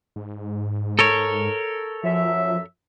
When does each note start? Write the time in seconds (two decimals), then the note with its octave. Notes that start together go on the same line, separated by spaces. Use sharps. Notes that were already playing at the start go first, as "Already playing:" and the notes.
0.16 G#2
0.99 A4 A#4 C#5
2.03 F#2 F3 E5